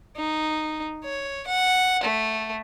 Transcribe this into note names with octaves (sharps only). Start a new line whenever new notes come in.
D#4
C#5
F#5
A3